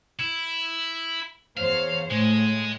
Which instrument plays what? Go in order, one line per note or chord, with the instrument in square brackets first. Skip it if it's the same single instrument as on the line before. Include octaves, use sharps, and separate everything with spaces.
[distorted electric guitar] E4
[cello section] E2 C5 C#5 [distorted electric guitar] F5
[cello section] A2 [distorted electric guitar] G#3